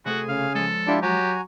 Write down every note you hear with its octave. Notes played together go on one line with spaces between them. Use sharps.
C3 A3 F#4 G#4 A4 G#5
C#3 F5
F3 G#3 A4
D4 E4 F4 G4
F#3 F#4 G4 G#5 A#5